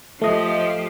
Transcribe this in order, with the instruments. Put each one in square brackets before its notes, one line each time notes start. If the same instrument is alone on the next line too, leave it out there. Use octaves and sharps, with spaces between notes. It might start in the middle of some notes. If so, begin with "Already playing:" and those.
[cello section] F3 G4 [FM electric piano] A3 D#5